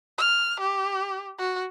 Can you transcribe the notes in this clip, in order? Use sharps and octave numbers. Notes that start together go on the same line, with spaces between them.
F6
G4
F#4